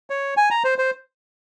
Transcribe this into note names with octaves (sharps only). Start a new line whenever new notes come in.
C#5
G#5
A#5
C5
C5